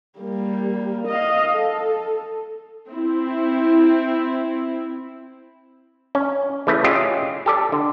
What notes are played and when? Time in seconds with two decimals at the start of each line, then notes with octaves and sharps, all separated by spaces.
0.19 G3 A#3
1.08 D#5 F5
1.56 A4
2.89 C4 E4
6.15 C#4
6.67 C#3 E3 A3 B4
6.84 C#4 F4 G4 G#4 D#5 E5
7.46 G4 A4 D5
7.72 D3